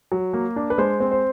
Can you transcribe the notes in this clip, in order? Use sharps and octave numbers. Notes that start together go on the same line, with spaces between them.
F#3
A#3
D4
B4
G#3 C5
C4
C5